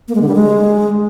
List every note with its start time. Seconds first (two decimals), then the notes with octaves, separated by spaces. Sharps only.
0.08 A#3
0.15 G#3
0.22 D3
0.28 G3
0.35 G#3